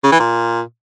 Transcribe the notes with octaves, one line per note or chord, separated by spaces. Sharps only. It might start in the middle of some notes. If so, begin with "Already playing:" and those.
C#3
E3
A#2